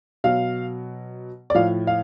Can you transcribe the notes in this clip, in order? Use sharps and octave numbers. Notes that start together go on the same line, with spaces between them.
B2 F#3 F5
D5
A2 F3 F5
F5